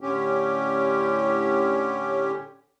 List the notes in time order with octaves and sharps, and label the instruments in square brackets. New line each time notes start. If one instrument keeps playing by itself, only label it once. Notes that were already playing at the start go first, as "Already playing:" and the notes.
[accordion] A2 D3 C#4 G4